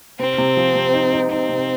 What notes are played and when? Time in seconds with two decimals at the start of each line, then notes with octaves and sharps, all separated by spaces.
0.19 C3 C4
0.38 C3
0.57 F3
0.75 C3
0.94 D#4
1.13 D#4
1.31 C4 D#4
1.49 C3